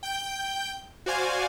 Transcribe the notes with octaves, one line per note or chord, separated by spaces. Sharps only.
G5 G6
F#4 C5 D5 F5 G#5